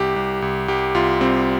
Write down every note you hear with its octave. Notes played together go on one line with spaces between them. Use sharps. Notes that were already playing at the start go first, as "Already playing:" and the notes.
Already playing: C2 G4
C2
C2
C2 G4
C2 F4
G3 C4